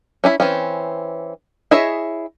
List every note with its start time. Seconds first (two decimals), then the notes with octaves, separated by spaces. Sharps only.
0.24 C#4 D4 E4 B5
0.40 E3 C4 C#4
1.71 E4 G#4 C#5 D#5 E5